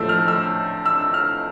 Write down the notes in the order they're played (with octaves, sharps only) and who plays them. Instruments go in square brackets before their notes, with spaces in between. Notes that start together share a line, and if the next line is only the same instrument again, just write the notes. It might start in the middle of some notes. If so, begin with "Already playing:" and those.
Already playing: [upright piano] A2 F3 A3 E6
F6
E6
E6
F6